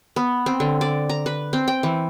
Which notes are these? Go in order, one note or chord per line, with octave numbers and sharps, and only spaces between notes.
B3
C4
D3
D5
A#5
B4
C4
G5
E3